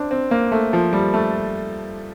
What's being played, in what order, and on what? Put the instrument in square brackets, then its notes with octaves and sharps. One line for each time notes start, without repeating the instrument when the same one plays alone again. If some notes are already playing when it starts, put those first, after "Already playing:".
Already playing: [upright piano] C4 D4
C4
A#3
A3
F3
G3
A3